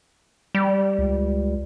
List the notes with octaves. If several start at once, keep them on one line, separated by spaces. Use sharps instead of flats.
G3
C#2